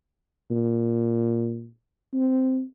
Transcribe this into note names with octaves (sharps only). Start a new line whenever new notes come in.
A#2
C4